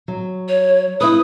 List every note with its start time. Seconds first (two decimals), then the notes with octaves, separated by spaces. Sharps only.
0.08 F#3
0.48 C#5
1.01 E4 B4 D#6